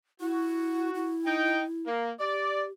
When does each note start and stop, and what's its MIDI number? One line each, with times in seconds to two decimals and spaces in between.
0.21 0.90 64
0.21 1.18 66
0.95 1.87 64
1.26 1.64 63
1.26 1.64 79
1.86 2.12 58
2.20 2.72 67
2.20 2.65 74